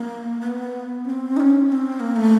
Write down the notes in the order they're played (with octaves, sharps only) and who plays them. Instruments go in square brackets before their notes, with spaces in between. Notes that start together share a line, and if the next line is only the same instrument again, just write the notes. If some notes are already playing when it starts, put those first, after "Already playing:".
Already playing: [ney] A#3
B3
C#4
C4
D#4
C#4
C#4
C4
A#3
A3